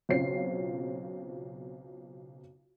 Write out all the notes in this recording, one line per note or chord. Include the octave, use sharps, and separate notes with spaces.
B1 C#3 C4 F4 C#5 C7